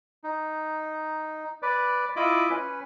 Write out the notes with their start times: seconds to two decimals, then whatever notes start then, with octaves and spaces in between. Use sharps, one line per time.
0.24 D#4
1.62 B4 D5
2.16 E4 F4 D#5 B5 D6
2.50 C#4 B4